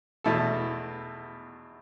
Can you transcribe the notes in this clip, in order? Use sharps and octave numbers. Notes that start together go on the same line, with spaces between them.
E2 B2 A3 E4 A4